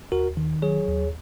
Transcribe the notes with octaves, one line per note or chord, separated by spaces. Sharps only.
D#2 F#4 A#4
D#3
F#3 G#4 C#5
D#2